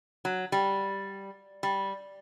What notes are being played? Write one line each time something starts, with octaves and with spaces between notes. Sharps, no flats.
F#3
G3
G3